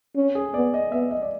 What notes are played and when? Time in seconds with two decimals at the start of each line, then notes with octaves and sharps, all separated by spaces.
0.16 C#4
0.35 G#4
0.54 B3 D5
0.74 D#5
0.92 B3 E5
1.11 D#5
1.22 D5